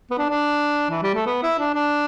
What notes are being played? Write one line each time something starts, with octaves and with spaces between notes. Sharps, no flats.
B3
D4
D4
E3
G3
A3
B3
E4
D4
D4